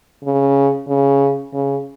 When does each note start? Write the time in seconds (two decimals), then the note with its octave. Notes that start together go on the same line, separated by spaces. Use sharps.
0.24 C#3
0.88 C#3
1.53 C#3